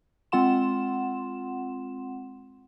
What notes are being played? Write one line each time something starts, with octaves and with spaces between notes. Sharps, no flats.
G#3 C4 F4 F#5 C6 E7